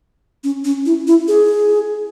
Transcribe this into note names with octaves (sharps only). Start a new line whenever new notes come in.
C#4
C#4
E4
E4
G#4